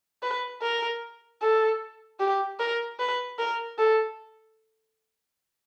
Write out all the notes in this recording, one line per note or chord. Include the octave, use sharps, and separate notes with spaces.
B4
A#4
A4
G4
A#4
B4
A#4
A4